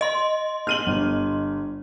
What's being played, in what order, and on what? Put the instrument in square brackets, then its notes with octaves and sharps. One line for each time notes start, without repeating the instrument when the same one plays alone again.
[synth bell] D#5 C6
[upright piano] F6 D#7 F#7
G1